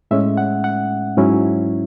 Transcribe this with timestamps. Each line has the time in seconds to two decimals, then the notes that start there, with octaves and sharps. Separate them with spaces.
0.11 A2 G#3 C#4 E5
0.37 F#5
0.64 F#5
1.17 G#2 F#3 C#4 E4